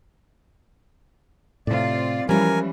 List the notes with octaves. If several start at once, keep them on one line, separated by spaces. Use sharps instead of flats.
A2 C3 C4 F4 D5
E3 F3 G3 G#3 C#4 A#4 G#5